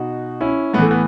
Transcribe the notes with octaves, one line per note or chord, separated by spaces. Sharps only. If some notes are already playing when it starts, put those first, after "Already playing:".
Already playing: B2 D#4 F#4
C#4 E4
A2 E3 A3 B3
B3